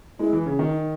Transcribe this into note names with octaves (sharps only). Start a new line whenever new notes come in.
G#3 E4
E3
C#3
D#3
D#4